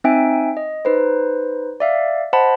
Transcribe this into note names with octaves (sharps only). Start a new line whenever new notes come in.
C4 D#4 E5 G5 G#5 D7
D#5
D#4 B4 C5
D5 E5 F5
C5 D#5 F#5 A5 B5